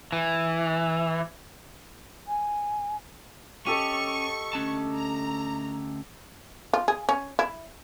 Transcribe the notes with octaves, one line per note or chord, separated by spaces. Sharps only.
E3
G#5
C#4 G4 A4 D#5 C#6
D2 C#4 A5
A#5
F4
G#4
C#4
E4